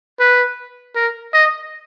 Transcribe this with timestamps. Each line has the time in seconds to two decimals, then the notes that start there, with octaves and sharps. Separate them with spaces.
0.20 B4
0.95 A#4
1.34 D#5